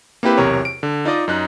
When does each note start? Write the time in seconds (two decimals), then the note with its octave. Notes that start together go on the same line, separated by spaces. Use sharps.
0.23 A#3 C4 E4 G4 B4
0.37 B1 E2 C3 A#4 C#5
0.65 D7
0.83 D3
1.05 D#4 F4 D5 D#5
1.28 F#2 D#4 F#6